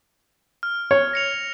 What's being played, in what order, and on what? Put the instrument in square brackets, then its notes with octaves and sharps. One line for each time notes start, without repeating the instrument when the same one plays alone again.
[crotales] F6
[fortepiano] C#5
[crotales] A#6 C#7 F7